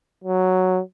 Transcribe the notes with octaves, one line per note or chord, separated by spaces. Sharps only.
F#3